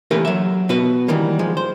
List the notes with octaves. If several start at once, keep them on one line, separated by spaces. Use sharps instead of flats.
E3 A3 A#3 G4 A#4 B4
F#3 E5
B2 F#4 B4
D#3 E3 F#3 G3 A#3
F3 G#3
C5